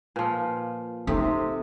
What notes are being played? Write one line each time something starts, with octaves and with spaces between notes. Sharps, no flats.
A#2 F3 B4
C3 C4 D#4 A4 D#6